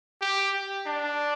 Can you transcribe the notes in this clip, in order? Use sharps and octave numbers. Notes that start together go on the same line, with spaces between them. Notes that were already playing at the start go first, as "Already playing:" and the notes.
G4
D4